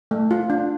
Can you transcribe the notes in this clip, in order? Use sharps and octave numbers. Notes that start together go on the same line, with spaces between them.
A3
F4
D4